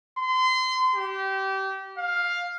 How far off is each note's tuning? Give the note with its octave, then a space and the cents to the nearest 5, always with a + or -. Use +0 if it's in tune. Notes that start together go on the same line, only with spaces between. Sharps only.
C6 -30
G4 -25
F5 +10